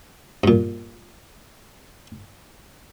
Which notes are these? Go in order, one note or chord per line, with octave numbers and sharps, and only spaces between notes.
G2 A#2